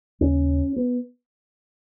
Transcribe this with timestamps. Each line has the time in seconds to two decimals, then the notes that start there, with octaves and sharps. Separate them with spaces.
0.21 D#2 C#3 C#4
0.76 B3